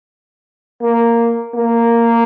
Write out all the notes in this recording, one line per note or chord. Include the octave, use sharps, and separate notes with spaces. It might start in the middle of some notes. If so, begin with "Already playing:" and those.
A#3
A#3